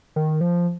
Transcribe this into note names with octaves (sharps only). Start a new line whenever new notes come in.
D#3
F3